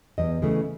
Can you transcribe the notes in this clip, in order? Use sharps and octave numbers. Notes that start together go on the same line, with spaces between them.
E2 D#5
C#3 E3 A3